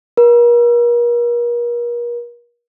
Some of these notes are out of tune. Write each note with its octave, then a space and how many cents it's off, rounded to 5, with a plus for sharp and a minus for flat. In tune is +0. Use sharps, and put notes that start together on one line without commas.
A#4 +40